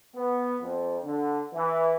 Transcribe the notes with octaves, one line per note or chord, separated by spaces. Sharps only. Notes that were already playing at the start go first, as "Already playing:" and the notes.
B3
F2
D3
E3